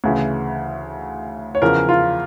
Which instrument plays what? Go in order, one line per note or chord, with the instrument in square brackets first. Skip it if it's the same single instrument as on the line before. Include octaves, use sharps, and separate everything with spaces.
[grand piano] D2 C#3 E3
C#5
E2 C#3 F3 A#4
F4